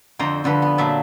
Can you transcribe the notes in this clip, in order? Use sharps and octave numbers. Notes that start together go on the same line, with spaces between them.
F2 D3 C5 A#5
F2 D3 G3 B4
B3
A#2 F#3 E5 A5